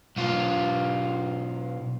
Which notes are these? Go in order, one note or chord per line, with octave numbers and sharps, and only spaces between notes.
B1 F4